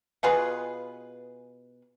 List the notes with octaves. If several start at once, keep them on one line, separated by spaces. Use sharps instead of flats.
B2 F4 G#4 B4